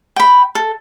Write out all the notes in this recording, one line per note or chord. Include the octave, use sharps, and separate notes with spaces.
G5 B5
A4